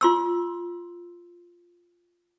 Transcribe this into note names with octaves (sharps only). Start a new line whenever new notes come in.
F4 C6 E6